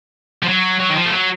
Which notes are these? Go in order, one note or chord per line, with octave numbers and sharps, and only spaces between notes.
F3
F#3
F#3
D#3
F3
A3
F#3